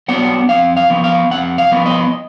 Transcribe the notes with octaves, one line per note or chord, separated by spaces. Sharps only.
F#3 B3 D4 F#5
F2 F5
F5
F3 B3
F5
F2 F#5
F5
F3 B3
D#5